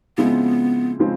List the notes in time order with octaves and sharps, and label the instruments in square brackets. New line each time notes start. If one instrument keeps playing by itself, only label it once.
[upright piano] C#3 F3 G#3 C4 E4 [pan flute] B3
[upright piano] C#3 F3 G#3 C4